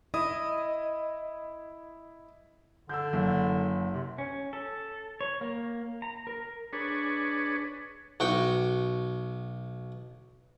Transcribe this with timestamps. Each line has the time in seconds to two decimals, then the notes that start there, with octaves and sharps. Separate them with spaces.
0.14 E4 D#5 D#6
2.89 D3 E6 G6
3.13 F#1
3.93 C3
4.18 C#4
4.53 A4
5.21 C#5
5.41 A#3
6.02 A#5
6.27 A#4
6.73 D4 G#4 B4 C#5
8.20 B1 F#4 G5